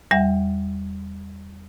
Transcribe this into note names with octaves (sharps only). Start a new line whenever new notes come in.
E2 G3 E5 F#5